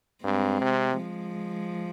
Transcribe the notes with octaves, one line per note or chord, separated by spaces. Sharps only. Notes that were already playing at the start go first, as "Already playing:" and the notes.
G2 G#3 C4
C3
F3 G#3